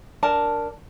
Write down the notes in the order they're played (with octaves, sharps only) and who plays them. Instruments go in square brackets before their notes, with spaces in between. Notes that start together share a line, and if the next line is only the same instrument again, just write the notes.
[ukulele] D4 A#4 A5